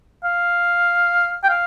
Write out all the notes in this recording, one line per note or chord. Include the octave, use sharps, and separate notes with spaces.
F5
G5
F5